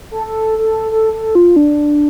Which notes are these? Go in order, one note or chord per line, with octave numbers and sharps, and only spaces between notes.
A4
A4
A4
A4
A4
F4
D4